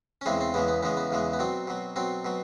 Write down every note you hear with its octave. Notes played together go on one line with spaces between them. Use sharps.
C#4
E2 C#3 E3 G#3 C4
C4
E2 C#3 E3 G#3 B3
B3
E2 C#3 E3 G#3 B3
B3
E2 C#3 E3 G#3
B3
B2 F#3 C4
B2 F#3
B2 F#3 C4
B2 F#3